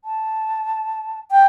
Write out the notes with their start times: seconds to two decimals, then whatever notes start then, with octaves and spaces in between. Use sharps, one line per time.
0.04 A5
1.31 G5